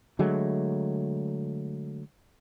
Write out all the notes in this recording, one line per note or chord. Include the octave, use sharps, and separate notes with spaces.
D3 F#3 G#3 A3